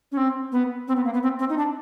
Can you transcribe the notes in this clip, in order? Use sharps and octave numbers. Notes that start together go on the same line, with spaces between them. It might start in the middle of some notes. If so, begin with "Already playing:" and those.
C#4
C4
B3
C4
B3
A#3
B3
C4
C4
D#4
D4